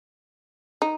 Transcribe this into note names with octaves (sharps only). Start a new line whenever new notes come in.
D#4